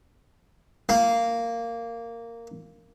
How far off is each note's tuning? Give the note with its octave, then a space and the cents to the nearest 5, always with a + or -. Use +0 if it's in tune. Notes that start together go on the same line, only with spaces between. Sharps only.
A#3 -10